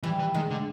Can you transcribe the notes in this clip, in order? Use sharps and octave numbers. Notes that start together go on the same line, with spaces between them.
E3 G3
E3
D#3 G#3
D3